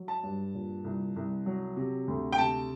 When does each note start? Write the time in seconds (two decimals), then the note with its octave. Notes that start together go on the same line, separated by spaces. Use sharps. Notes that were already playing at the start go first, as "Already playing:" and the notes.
Already playing: F#3
0.08 A5
0.23 G2
0.55 A#2
0.84 C2
1.16 C2
1.46 F#3
1.77 C3
2.08 D2
2.32 G5
2.38 C3 A5